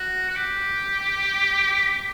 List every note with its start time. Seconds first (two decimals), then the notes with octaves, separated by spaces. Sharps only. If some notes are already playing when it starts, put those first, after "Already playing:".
Already playing: F#4
0.30 F#4
0.35 G4